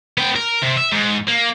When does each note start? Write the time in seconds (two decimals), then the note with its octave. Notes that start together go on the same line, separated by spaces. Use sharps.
0.18 B3 G5
0.36 A#4
0.62 C3
0.77 E5
0.92 G#2
1.28 A#3